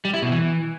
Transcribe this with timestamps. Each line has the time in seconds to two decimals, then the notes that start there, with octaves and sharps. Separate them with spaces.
0.05 G3
0.14 E4
0.22 B2
0.31 E3